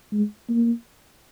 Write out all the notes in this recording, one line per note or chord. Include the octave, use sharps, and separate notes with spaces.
G#3
A#3